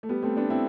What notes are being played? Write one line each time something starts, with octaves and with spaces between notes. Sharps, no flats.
A3
G3 B3
A3 C4
B3 D4
C4 E4